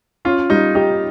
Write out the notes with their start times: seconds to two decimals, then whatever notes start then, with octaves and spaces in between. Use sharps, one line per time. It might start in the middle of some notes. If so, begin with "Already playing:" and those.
0.25 C#4 F4
0.50 G3 D#4
0.75 D#4 G4